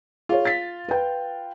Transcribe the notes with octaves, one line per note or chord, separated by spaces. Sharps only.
F4 G#4 C#5
A6 B6
B4 G5